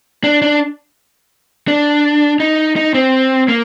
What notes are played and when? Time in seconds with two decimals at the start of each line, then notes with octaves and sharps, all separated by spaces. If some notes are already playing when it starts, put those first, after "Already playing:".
0.24 D4
0.42 D4
1.68 D4
2.40 D#4
2.76 D#4
2.94 C4
3.48 A#3